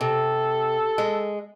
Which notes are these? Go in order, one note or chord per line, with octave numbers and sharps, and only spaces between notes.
C3 A4
G#3